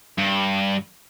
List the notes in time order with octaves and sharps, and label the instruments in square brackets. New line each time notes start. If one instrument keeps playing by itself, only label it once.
[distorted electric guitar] G2